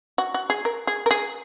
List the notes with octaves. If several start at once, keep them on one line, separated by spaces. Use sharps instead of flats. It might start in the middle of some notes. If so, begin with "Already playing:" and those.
F#4
F#4
G#4
A#4
G#4
A#4
G#4